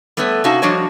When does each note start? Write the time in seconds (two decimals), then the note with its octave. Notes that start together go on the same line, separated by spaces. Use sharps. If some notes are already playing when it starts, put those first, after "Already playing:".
0.17 G3 A3 B3 B4 C#5
0.44 C3 C#4 D#4 F#4 F5 A5
0.62 F3 G3 D4 F#4 C#5 D#5